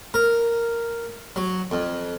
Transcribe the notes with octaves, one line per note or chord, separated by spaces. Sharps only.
A#4
F#3
F2